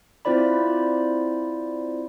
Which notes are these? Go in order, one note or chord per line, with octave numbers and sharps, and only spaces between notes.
C4 E4 F4 C5 D5 B5